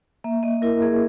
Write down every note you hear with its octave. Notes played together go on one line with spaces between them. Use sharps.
A#3 E5
A#3 D#5
E4 A#4
A#3 G#4